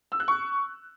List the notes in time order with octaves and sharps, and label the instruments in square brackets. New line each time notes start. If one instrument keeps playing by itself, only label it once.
[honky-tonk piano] E6
F#6
C#6